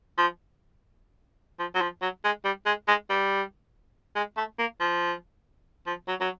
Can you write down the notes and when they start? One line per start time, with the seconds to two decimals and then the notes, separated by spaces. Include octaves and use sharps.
0.18 F3
1.59 F3
1.75 F#3
1.81 F3
2.02 F#3
2.24 G#3
2.44 G3
2.66 G#3
2.88 G#3
3.10 G3
4.16 G#3
4.37 A3
4.59 A#3
4.80 F3
5.86 F3
6.08 F#3
6.20 F#3